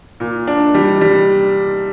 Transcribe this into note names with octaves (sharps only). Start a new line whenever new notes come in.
A#2
D4
G3
G3